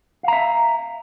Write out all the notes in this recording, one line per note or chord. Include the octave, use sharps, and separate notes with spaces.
E5 F5 A#5